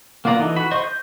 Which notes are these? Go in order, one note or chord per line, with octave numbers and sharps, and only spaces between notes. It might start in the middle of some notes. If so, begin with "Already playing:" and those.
A#3 B3 F4 D5 A#5
E3 D#4 A4
F#4 B5
C5 D#5 C6 C#6
G6